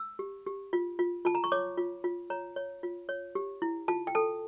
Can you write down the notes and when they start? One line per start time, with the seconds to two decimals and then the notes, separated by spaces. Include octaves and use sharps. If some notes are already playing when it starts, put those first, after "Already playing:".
Already playing: E6
0.19 G4
0.46 G4
0.73 F4
0.99 F4
1.25 F4 A5
1.35 A#5
1.44 C#6
1.52 C#5 D6
1.78 F4
2.04 F4
2.30 C#5 A#5
2.56 C#5
2.83 F4
3.09 C#5
3.35 G4
3.62 E4
3.88 F4 A5
4.07 G5
4.15 A4 A5